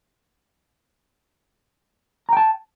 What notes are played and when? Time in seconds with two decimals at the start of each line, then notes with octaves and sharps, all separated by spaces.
2.29 A#5
2.33 G5
2.37 A5